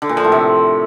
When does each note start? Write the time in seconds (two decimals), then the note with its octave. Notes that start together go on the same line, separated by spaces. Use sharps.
0.02 D3
0.09 A#2
0.17 F3
0.24 A2
0.32 C3